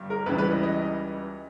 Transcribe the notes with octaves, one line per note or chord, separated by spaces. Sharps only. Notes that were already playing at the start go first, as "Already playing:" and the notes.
Already playing: G1 G2 G3
A#4
C#2 C#3 E3 G3 B4
B4
D#5
D#5